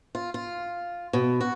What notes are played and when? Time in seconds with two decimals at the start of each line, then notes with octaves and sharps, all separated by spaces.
0.15 F4
0.34 F4
1.13 B2
1.41 F#4